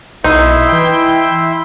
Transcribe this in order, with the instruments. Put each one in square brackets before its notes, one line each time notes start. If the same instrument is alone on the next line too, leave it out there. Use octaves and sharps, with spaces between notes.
[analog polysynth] B1 [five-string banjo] D#4 [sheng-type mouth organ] E4 E5 C6
[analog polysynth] E3 G5